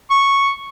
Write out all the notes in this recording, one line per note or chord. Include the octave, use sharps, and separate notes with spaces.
C#6